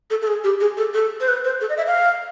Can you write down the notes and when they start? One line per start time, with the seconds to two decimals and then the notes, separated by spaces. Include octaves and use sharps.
0.11 A4
0.22 A4
0.27 G#4
0.44 G4
0.61 G#4
0.77 A4
0.94 A4
1.20 C5
1.28 B4
1.44 C5
1.61 A4
1.69 D#5
1.77 E5
1.87 F5